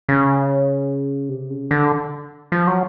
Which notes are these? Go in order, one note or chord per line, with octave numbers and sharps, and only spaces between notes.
C#3
C3
C#3
D3
F3
F#3